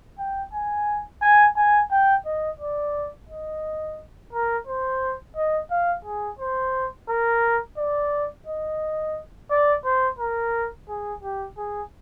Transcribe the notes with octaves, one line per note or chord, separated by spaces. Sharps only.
G5
G#5
G#5
G#5
G5
D#5
D5
D#5
A#4
C5
D#5
F5
G#4
C5
A#4
D5
D#5
D5
C5
A#4
G#4
G4
G#4